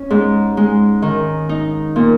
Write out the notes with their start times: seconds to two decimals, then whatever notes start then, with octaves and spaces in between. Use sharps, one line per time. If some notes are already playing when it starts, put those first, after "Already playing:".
Already playing: C#4
0.10 G#2
0.57 G#3
1.02 D#3
1.49 D#4
1.96 A#2